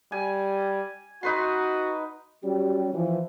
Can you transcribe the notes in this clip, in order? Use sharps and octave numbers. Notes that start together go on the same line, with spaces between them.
G3 G#5
D#4 F#4 B4 C6
F#3 G3 C#4 F#4 G4
E3 F3